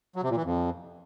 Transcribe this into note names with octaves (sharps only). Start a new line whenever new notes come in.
F#3
C3
A#2
E3
F2